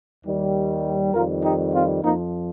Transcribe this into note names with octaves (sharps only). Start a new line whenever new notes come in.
D#2 D#3 G3
F2 D#3 G3 F4 A#4
D#4 G4
C4 F4
F2 F3 A#3 D#4